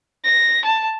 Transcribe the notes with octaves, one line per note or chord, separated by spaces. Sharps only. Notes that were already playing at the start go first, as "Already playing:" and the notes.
A#6
A5